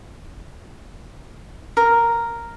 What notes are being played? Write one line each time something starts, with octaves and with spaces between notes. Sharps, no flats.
A#4